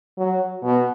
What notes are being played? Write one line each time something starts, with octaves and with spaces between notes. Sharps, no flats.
F#3
B2